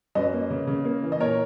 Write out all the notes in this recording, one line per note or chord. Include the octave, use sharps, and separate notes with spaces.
F#2 B4 D#5
A#3
C#3
C#3
A#3
E3
D#5
A#2 A#4 C#5